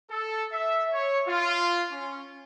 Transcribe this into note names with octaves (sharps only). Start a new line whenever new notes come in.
A4
E5
C#5
F4
C#4